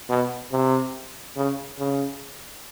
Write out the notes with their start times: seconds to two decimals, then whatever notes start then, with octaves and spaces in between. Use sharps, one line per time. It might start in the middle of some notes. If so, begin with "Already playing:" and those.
0.09 B2
0.52 C3
1.36 C#3
1.78 C#3